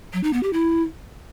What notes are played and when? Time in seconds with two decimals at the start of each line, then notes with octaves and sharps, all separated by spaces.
0.13 F#3
0.23 D#4
0.33 B3
0.43 G4
0.53 E4